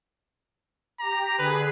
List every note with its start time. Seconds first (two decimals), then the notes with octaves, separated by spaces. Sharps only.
1.00 G4 A#5
1.39 D3 G#4 B4